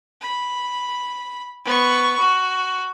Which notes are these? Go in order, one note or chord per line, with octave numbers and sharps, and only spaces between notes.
B5
B3 C#6
F#4